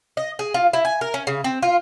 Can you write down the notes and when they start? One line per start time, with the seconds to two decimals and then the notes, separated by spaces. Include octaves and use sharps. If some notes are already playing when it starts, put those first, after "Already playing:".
0.17 D#5
0.39 G#4
0.54 F4
0.73 E4
0.85 G#5
1.01 A#4
1.14 C#4
1.27 C#3
1.44 C4
1.63 F4